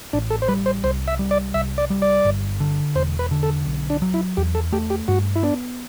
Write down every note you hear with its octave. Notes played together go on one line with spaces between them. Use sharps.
A1 D4
A4
C5
G3 B4
C5
C2 C5
E5
G3
D5
C2 E5
D5
G3
D5
G1
D3
E1 C5
B4
D3
A4
B1
D4
F#3
E4
E2 G4
A4
A3 G4
G4
G2 F#4
E4
B3 D4